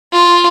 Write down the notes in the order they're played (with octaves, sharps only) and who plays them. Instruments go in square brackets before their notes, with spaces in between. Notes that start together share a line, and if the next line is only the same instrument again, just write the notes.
[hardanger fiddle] F4